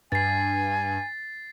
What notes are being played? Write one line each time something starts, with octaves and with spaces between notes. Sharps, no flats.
G2 G#5 A6 C7